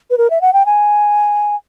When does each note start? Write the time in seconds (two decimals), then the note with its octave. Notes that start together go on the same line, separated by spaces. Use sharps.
0.10 B4
0.18 A#4
0.30 E5
0.41 F#5
0.53 G5
0.66 G#5